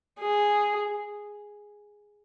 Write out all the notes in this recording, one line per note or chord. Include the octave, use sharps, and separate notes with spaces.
G#4